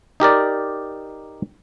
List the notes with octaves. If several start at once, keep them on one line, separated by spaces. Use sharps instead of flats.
D#4 G4 A#4 D5